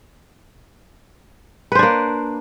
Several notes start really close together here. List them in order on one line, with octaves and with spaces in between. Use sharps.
B4 C5 D4 A#3